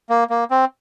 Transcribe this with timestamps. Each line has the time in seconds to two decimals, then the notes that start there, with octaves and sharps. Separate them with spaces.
0.10 A#3
0.30 A#3
0.51 C4